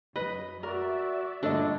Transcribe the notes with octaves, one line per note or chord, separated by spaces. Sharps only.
F#2 B4 D#5
F#4 A#4 D5 E5
G2 A#2 D3 A3 D4 A4 D#5